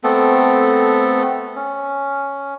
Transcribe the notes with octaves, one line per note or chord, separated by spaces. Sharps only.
A3 B3 C4 A4
C#4